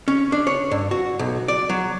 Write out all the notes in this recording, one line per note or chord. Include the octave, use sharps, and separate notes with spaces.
C#4
D4
C#5
G2
F#4
B1
D5
F#3